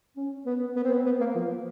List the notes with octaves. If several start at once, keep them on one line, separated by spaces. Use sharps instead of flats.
C#4
B3
B3
C4
B3
B3
A#3
F3